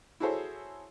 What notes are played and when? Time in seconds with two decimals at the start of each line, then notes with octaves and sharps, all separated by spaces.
0.20 E4 F#4 G#4 A4 C5 C#5